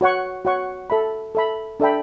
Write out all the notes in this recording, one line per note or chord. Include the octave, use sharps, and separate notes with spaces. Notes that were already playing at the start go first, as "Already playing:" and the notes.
F#4 C#5 F#5 C#6
F#4 C#5 F#5 C#6
A4 E5 B5
A4 E5 B5
D4 A4 E5 G5 B5